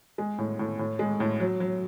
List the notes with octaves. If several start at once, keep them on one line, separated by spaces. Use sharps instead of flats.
G#3
A2
A2
A2
G#3
A2
F#3
F#3